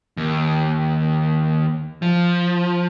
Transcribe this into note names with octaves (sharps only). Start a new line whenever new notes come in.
D#2
F3